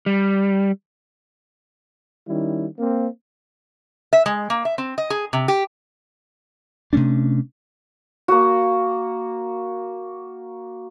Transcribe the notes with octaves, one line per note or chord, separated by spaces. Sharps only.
G3
D#3 G3 C#4 E4
A#3 C4
E5
G#3
A#3
E5
C4
D#5
G#4
C3
G4
C3 A3 C#4 D4
A#3 F#4